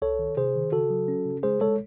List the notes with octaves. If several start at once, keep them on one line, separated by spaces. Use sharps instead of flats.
C2 A4 C#5
D#3
C3 G#4 C5
D#3
C#3 F#4 A4
F#3
C#4
C#3
G#3 G#4 C5
G#3 A4 C#5